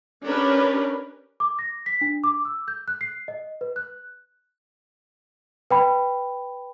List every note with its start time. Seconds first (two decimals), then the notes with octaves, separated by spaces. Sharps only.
0.24 C#4 D4 G4 A#4 B4
1.40 D6
1.59 A#6
1.86 B6
2.01 D4
2.24 D6
2.45 E6
2.68 G6
2.88 F#6
3.01 C7
3.28 D#5
3.61 B4
3.76 F#6
5.71 B4 G5 B5